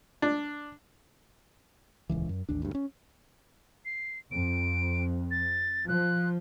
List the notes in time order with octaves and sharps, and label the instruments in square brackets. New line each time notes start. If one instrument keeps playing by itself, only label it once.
[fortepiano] D4
[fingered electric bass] D#1 C#2 E3
F#2
A1 D#2 D4
D2 G2
C#4
[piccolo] C7
[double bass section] F2 [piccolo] D7
[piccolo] A6
[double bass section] F3 [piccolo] F#6